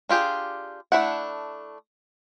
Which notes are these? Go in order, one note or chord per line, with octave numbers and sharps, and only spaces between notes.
D4 F4 G4 G#4
A3 D4 E4 F#5